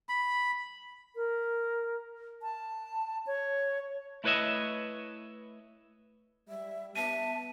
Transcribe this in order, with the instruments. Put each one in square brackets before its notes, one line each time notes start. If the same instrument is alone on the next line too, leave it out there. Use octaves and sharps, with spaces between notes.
[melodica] B5
[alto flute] A#4
A5
C#5
[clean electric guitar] A3 E4 B4 C#5 D#5 E5
[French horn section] G3 [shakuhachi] E5
[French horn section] B3 [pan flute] E5 [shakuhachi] A5 [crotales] D#7